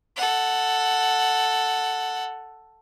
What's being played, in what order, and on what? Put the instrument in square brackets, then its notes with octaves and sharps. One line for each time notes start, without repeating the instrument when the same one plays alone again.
[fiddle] A4 F#5